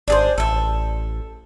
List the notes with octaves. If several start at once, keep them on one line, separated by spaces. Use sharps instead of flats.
G#1 D4 G#4 C5
A1 A4 E5